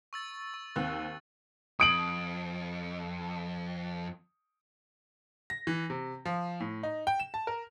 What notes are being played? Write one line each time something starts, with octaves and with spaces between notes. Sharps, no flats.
C#6 E6 A6
C#6
D#2 C4 F#6
F2 D#6 D7 F#7
A#6
E3
C3
F3
A2
D#4
G5
E7
A5
A#4